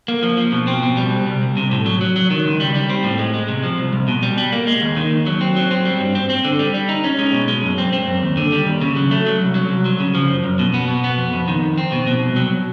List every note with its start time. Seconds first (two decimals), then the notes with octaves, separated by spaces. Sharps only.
0.08 A#3
0.23 F3
0.38 F3
0.52 B2
0.67 C4
0.83 B2
0.97 G3
1.12 C2
1.26 C2
1.42 C2
1.57 C3
1.71 A2
1.86 F#3
2.01 F#3
2.16 F#3
2.30 D#3
2.45 C#2
2.60 G3
2.75 G3
2.90 C4
3.04 A2
3.19 G#3
3.34 G#3
3.48 C3
3.63 F3
3.79 C2
3.93 C2
4.08 B2
4.23 G3
4.38 G3
4.52 A#3
4.67 G#3
4.82 D#2
4.96 D#3
5.11 D#2
5.26 F#3
5.41 C4
5.56 F#3
5.71 C4
5.85 G3
6.00 G2
6.15 C4
6.30 C4
6.44 D3
6.59 G3
6.74 G3
6.89 D#4
7.04 C#4
7.19 G#3
7.33 B2
7.48 G#3
7.63 F#2
7.78 C4
7.93 C4
8.07 F#2
8.23 D#2
8.37 D3
8.52 G3
8.66 D#2
8.81 C#3
8.96 F#3
9.11 A3
9.26 F#3
9.41 C2
9.55 F#3
9.70 C2
9.85 F#3
10.00 C#3
10.15 F3
10.30 F#2
10.44 F#2
10.59 B2
10.74 B3
10.88 B2
11.04 B3
11.18 F2
11.33 F2
11.48 D#3
11.63 F2
11.78 C4
11.92 B2
12.07 B2
12.23 C2
12.36 F#3